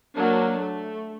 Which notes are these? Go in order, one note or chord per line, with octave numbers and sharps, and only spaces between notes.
F#3 A#3 D4
A3